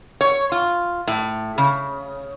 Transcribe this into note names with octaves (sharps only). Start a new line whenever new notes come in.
C#5
F4
A2
C#3